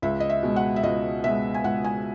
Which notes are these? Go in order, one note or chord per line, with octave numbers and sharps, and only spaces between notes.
C#2 E5
D#5
E5
B2 G#3
F#5
E5
C#2 D#5
B2 G#3 E5
G#5
C#2 F#5
G#5